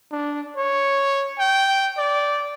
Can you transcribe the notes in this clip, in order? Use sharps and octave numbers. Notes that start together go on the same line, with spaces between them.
D4
C#5
G5
D5